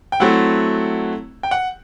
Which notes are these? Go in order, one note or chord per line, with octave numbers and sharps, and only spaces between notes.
G5
F#3 A3 C4 E4 F#5
G5
F#5